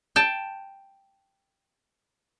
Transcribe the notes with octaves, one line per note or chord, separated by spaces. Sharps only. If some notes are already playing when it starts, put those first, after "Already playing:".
G5 A5